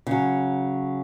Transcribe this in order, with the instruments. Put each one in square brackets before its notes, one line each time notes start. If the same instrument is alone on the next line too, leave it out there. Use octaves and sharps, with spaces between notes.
[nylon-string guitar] C#3 F#3